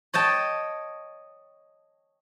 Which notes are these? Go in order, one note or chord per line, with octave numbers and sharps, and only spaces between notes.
C#5 D#5 G5 A5